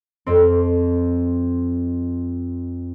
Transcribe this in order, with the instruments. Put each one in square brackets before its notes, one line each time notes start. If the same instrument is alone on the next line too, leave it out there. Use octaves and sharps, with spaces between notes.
[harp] F2 C4